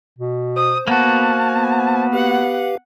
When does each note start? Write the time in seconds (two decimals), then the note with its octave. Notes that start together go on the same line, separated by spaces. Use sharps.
0.19 B2
0.56 C5 D#6
0.88 A#3 B3 F#4 A5
1.51 B3
2.13 G4 B4 F5 F#5